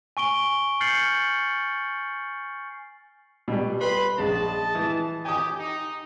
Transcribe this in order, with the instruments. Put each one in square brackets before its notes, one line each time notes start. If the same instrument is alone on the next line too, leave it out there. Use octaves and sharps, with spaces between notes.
[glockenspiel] G#5 C#6 D7 G7
F6 G6 A6 C7 C#7 F#7
[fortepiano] B2 G3
[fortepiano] B4 [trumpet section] B5 C6
[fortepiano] A#1 C#3 [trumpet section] D#5 A5
[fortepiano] E3
[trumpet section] G4 [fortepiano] G#5 D#6
[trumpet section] D#4